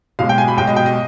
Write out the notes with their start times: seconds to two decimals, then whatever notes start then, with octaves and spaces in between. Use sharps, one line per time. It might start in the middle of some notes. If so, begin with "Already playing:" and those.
0.19 B1 B2 G#3 F5
0.29 G5
0.38 G#5
0.48 B5
0.57 B1 B2 G#3 G5
0.67 D#5
0.76 G5
0.86 D#5